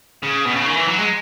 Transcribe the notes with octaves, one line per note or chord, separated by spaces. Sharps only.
C#3
B2
C#3
D#3
E3
F#3
G#3